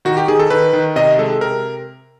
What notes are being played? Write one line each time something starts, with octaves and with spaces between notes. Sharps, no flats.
D#3 F#4
G4
D#3 G#4
A4
D#3 B4
D#3
C3 D#5
G#3 A4
C3 A#4